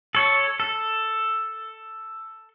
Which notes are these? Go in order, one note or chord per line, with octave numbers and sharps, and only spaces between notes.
A4 C#5
A4